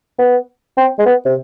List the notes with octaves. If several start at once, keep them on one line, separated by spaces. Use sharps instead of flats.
B3
C4
G#3
B3
C3